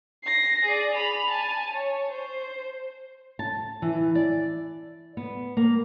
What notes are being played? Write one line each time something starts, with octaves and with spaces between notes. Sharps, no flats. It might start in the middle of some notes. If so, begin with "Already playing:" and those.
A#6 C7
G#4 D5
B5 F7
G#5 A5
C#5
C5
A5
E3
D5
B3
A#3